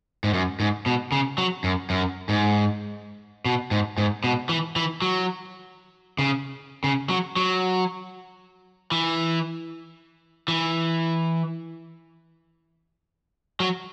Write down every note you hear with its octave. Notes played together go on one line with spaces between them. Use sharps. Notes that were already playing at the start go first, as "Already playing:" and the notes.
G#2
F#2
G#2
B2
C#3
F#3
F#2
F#2
G#2
B2
G#2
G#2
B2
E3
E3
F#3
C#3
C#3
F#3
F#3
E3
E3
F#3